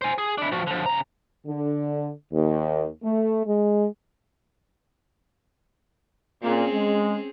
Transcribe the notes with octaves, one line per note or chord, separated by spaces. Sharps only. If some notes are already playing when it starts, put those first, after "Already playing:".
C5 G#5
G#4
D4 E4
F3 F#4
D3 F3
C#3 A#5
D3
D#2
A3
G#3
A#2 C4 C#4 G#4
G#3